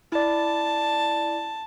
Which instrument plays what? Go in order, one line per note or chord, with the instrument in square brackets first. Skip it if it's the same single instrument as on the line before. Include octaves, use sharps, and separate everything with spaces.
[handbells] E4 D5 [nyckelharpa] A5